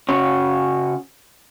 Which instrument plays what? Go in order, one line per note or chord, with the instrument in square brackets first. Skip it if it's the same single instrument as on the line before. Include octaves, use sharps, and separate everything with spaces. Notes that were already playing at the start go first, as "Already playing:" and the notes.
[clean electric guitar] C#3 C#4 F#4 C#5